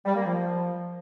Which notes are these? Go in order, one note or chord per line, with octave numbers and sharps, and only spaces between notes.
G3
A#3
F3